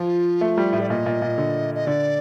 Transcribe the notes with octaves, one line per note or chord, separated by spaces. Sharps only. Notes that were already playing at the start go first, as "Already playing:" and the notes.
Already playing: F3 F4
A3
G3
A2
D5
A#2 D#5
A#2
A#2
D3
D#5
D3 D5